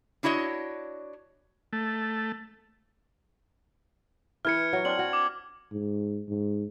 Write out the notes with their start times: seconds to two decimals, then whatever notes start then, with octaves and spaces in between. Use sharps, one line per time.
0.23 D4 E4 F#4 C#5 D#5
1.73 A3
4.45 E3 B4 F6 G#6 C#7
4.73 F#3 F#4
4.85 C4 D4 C5 F6 F#7
4.99 F#4
5.13 D6
5.72 G#2
6.29 G#2